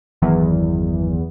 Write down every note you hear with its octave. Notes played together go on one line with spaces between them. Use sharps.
G1 E2 D#3 F#3